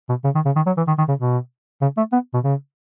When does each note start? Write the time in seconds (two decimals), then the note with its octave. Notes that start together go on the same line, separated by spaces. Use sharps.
0.09 B2
0.24 C#3
0.35 D#3
0.45 C#3
0.56 D#3
0.66 F#3
0.77 E3
0.87 D#3
0.98 D#3
1.08 C#3
1.19 B2
1.82 C#3
1.97 A3
2.13 B3
2.34 B2
2.44 C#3